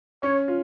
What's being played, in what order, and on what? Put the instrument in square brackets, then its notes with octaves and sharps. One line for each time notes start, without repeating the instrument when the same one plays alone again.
[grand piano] C#4 [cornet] C#5
[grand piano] F4